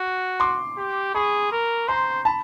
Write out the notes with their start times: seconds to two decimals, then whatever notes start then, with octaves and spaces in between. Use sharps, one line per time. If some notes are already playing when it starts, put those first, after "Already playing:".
Already playing: F#4
0.40 C6 D6
0.77 G4
1.15 G#4 B5 C#6
1.52 A#4
1.88 C5 A#5 C6
2.25 A5 B5